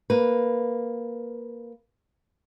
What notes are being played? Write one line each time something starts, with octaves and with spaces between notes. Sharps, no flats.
A#3 B4